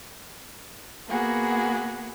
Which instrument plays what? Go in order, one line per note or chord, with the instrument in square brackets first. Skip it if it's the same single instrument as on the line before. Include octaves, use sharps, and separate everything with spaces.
[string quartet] A#3 B3 F#4 G#4